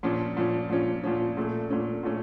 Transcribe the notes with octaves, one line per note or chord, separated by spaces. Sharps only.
A#2 F3 C#4
A#2 F3 C#4
A#2 F3 C#4
A#2 F3 C#4
A#2 A3 C#4
A#2 A3 C#4
A#2 A3 C#4